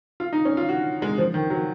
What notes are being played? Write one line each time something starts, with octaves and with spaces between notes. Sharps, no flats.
F4
D#4
C#4
F4
F#4
G#3
F3
D#3
F#3